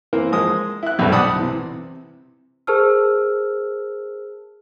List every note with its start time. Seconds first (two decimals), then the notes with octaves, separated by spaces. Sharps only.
0.13 E3 A#3 C4 A#4
0.32 F3 G#3 A#3 D#6
0.83 E4 F#6
0.99 B1 G2 B2 G3 A4
1.12 B1 D5 F#5 A5 B5 D#6
1.36 C3 E3
2.67 G#4 A#4 C5 A5 E6 F6